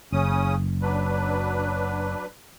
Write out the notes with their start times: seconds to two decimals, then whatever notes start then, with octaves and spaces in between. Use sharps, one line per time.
0.12 F#1 C#3 C#4 D#6
0.82 F#3 D4 B4